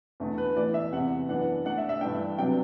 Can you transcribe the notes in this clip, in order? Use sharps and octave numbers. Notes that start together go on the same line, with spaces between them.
E2 D3 A3
B4
A2 E3 B3 D5
E5
E2 C3 E3 F#5
F#2 E3 B3 D4 F#5
D3 A3 D4 F#5
E5
E5
G2 E3 A3 D4 G5
C3 F#3 B3 D4 G5